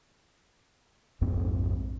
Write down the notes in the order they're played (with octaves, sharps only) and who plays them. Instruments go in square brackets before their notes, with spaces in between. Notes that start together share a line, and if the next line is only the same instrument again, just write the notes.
[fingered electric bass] A#1 F2 G#2 C4